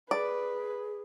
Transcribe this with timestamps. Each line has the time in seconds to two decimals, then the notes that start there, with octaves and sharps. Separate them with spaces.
0.11 G#4 B4 D5